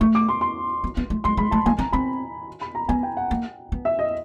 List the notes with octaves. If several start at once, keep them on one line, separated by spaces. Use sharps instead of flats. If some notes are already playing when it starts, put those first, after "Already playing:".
A3 C#6
D6
C6
C6
B3
B3
A3
G#3 C6
G#3 B5
A3 A5
A#3 G#5
C4 A#5
C4 B5
B5
A#5
B3 G#5
G5
F#5
A#3
B3
E5
D#5